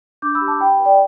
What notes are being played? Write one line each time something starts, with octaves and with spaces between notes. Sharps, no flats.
D4 D6 G6
B5 E6
G4
A5 D6
E4 G5 B5
B4
D5 G5